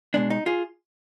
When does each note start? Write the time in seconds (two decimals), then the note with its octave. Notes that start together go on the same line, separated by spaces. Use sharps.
0.14 B2 G#3 B3 D4
0.30 D#4
0.46 F4 G#4